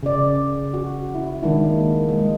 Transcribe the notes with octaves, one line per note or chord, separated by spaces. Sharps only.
C#3 D5
F#4
E4
D#3 G#3 D4 E4
A#3
G#3